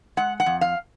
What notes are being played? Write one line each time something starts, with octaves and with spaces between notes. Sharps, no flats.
G#3 F#5
F#5
F2
F5